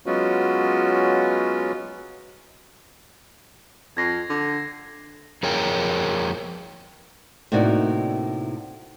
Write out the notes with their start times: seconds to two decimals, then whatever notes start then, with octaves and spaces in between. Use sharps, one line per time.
0.06 F#3 G#3 B3 C#4 F4 F#4
3.97 F2 G#6 A#6 C7
4.30 D3
5.43 F2 G#4 A#4 C#5 G5
7.52 A2 C3 A#3 D4 D#4 F#4